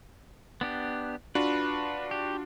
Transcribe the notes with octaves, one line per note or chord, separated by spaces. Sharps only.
B3 D4 G4
D4 F4 F#4 B4
G4